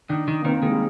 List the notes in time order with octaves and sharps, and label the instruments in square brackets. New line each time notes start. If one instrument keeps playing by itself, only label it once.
[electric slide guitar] D#3 [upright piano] D4
[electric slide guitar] D#3
[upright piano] A#3
[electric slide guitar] D#3 [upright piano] C4
[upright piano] A#3
[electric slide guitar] D#3 [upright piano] G#3
[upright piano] G3